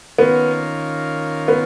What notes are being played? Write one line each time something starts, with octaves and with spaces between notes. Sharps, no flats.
D#3 A#3 B3 C#4 F4
B3